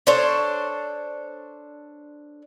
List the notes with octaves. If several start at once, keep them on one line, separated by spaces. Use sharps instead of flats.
D4 A4 C5 C#5